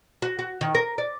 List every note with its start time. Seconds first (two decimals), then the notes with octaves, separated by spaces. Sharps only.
0.22 F#4
0.39 F#4
0.61 D#3
0.75 A#4
0.98 D5